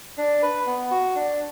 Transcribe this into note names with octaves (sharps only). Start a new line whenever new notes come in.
D4
B4
B3
F#4
D4